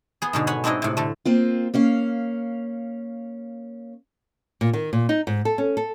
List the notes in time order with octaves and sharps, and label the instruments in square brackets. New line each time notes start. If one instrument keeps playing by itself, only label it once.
[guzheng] B3 G#4
G#2 B2 D3
C#5 F#5 G#5 B5
G#2 C4 D4 E4 D#5
A2 C3
D3 A3
[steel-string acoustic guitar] A#3 C4 F4
A#3 C#4 F5
[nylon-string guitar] A#2
D#3
A#2
D#4
G#2
A4
C#4
A4